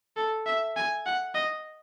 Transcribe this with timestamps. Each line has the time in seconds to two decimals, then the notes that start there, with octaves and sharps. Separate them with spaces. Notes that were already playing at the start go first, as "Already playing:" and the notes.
0.17 A4
0.46 E5
0.77 G#5
1.06 F#5
1.35 D#5